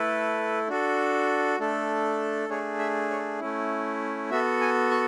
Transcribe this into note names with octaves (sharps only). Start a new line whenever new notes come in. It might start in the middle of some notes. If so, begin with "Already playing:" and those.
Already playing: A3 E4 A4 B4
D4 F#4 A4
A3 D4 A4
A3 D4 G#4 C#5
E5
C#5
A3 C#4 E4
B3 F#4 A4 E5
G#5
C#6